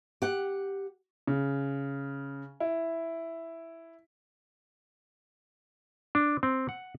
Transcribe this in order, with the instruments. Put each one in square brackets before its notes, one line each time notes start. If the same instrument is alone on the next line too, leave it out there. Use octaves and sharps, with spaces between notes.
[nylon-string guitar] G4 F#5
[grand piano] C#3
E4
[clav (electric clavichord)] D4
C4
F#5